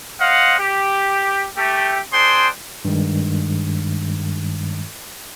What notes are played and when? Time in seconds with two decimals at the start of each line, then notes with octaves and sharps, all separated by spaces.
0.20 C5 D#5 F5 F#5
0.59 G4
1.57 A3 G4
2.13 D4 G#4 C5 G5 C6
2.85 G2 D#3 G#3